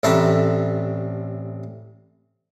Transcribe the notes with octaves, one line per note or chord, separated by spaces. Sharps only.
A1 C3 D4 A4 A#5 B5